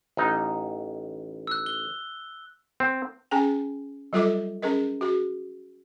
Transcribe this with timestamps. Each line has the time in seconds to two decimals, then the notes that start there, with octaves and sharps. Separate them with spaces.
0.17 A1 D#4
1.47 E6 F#6
1.66 G7
2.80 C4
3.31 C#4 G#4 G5 G#5
4.13 F#3 G3 F4 A4 D#5 D6
4.62 C#4 G#4 A#4 D#5
5.01 F#4 G#4